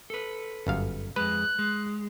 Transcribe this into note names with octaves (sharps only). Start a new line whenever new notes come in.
A4 B4
G1 F#2 F5
F2 G#3 B4 F#6
G#3